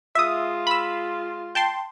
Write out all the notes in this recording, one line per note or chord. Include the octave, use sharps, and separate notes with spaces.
G#3 F4 E5 D#6
B5 E6
G5 A5 C6